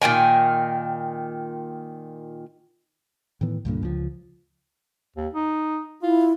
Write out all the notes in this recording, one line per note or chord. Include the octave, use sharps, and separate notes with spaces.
A#2 D#3 G5 G#5
A2 D#3 E3 B3
C2 G2 A#2 D3
C#2 F3
D#2
D#4
E4 F4